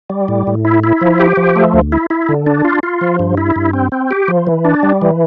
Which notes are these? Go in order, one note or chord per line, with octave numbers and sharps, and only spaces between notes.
G3
A2
A2
E4
E4
F3
G4
F3
A3
D2
E4
E4
D3
D4
F4
F4
F3
G2
E4
G2
C4
C4
G4
F3
E3
D4
G3
E3